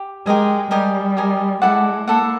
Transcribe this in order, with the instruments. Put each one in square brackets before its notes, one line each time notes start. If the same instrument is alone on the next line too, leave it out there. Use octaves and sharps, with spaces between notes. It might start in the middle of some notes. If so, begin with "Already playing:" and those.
Already playing: [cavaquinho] G4
[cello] G#3 [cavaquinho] G4 A#4 D#5 G#5
[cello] G3 [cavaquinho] G4 A#4 D#5 G#5
[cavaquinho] G4 A#4 D#5 G#5
[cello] G#3 [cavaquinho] E4 A4 D5 F#5
[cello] A#3 [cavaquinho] E4 A4 D5 F#5